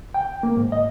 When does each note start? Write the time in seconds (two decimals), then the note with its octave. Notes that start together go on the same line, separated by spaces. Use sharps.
0.14 G5
0.43 A#3
0.57 G#2
0.72 D#5